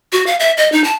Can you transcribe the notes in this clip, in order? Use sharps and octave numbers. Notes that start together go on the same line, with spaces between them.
F#4
F5
E5
D#5
D#4
A5